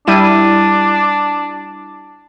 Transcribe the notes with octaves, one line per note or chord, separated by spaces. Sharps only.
G3 D4 E4 D#7